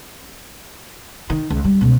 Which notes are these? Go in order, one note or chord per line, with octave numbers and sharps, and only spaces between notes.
D#3
C#2
G3
C#2 B2